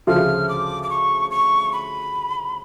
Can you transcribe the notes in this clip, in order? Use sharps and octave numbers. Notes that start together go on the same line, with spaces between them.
D2 C#3 F3 A3 F4 F6
D6
D6
C#6
C#6
B5